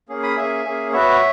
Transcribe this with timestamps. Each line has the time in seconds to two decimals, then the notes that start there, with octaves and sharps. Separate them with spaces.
0.09 A#3 C#4 G#4
0.23 B5 D#6
0.37 A#3 C#4 G#4 E5 G#5
0.65 A#3 C#4 G#4
0.93 B3 F#4 C#5 E5